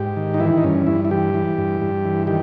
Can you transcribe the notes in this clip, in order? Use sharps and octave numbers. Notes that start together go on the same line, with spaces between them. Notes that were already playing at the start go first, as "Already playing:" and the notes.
Already playing: G#2 G4
D#3
D#4
E3 E4
D#4
G2 C#4
G2 E4
E4
E3 G4
E3
G2
G2
E3
D#3 G4